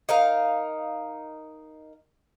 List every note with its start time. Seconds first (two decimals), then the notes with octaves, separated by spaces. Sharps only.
0.09 D#4 A#4 F5